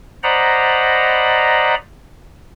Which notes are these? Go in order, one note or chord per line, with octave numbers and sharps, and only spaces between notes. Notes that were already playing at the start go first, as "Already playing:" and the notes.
C5 D5 D#5 F#5 A#5 B5